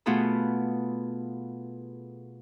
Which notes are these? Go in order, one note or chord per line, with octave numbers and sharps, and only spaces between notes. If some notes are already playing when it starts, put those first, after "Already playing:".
B2 A3 B3 F4 G#4 A4